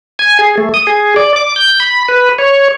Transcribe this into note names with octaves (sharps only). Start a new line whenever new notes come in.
G#5
G#4
A3
D#6
G#4
D5
D6
G6
B5
B4
C#5